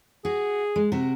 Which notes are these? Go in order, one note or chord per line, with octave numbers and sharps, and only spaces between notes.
F#4 G#4
G#3
C3 F#4 A#4